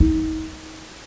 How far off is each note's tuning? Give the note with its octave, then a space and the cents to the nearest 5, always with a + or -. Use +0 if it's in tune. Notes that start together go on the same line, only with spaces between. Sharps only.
D#4 +25